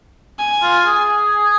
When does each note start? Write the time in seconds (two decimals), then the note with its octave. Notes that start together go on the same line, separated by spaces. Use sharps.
0.39 G#5
0.63 F4
0.86 G#4